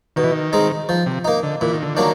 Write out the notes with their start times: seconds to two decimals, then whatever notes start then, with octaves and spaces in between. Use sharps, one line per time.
0.16 B2 D#3
0.24 E3
0.32 D#3
0.53 G#3 C4 D#4
0.89 F3
1.06 C3
1.25 A#3 D#4
1.43 D3
1.61 A#2 E3
1.73 D#3
1.82 D3
1.95 D#3 F#3 A#3 D4